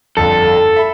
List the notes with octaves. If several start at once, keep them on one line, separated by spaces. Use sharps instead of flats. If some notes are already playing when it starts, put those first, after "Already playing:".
G1 F2 D3 A4
E5 B5